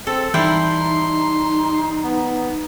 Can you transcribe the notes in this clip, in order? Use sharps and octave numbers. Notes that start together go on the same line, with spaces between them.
C4 A4
E3 G3 D#4 E4 G4 C6
B3